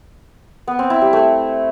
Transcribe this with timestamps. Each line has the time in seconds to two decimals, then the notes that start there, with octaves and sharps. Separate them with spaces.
0.68 B3
0.79 C4
0.90 E4
1.02 G3
1.13 A3